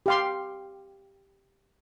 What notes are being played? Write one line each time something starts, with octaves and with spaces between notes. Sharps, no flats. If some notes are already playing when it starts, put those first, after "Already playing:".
G4 F5 C6